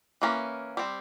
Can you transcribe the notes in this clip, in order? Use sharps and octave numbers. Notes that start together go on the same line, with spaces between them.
E3 A#3 C#4
G3 C4